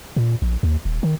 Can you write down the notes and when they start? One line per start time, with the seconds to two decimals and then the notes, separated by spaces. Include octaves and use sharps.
0.16 A#2
0.42 A#1
0.63 D#2
0.85 D#1
1.03 D#3